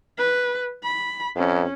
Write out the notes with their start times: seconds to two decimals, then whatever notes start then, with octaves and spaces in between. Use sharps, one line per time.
0.18 B4
0.83 B5
1.36 F2 C#4